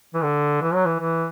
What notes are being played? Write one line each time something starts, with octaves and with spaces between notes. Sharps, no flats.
E3
D3
E3
F#3
E3
E3